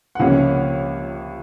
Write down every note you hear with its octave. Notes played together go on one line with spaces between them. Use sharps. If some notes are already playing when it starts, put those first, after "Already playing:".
F#5
C#2 C3 F3 A#3 C#4 F5